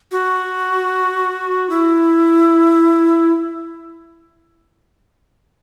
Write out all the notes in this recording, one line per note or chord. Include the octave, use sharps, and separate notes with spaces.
F#4
E4